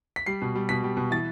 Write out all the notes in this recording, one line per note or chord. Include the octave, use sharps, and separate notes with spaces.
B6
G3 C7
B2
G3
B2 B6
G3
B2
E3 A6